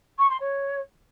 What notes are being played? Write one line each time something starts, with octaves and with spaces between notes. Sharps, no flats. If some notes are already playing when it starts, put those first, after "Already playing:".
C#6
C6
C#5